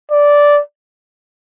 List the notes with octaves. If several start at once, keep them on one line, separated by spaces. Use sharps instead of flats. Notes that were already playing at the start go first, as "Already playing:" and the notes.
D5